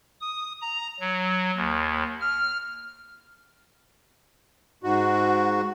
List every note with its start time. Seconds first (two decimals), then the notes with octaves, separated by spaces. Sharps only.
0.21 D#6
0.61 A#5
1.00 F#3
1.56 D#2
2.21 F6
4.83 G#2 F#4